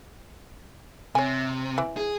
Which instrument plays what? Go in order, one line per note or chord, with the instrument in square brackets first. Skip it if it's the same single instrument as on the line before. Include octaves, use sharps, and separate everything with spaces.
[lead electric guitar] C3 [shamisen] C#5 G#5
[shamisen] E3
[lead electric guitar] G#4